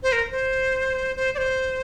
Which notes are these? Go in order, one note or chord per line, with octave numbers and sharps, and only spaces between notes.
C5
A#4
C5
C5
D5
C5